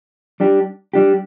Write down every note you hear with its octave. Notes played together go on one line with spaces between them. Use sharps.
G3 D4 G4
G3 D4 G4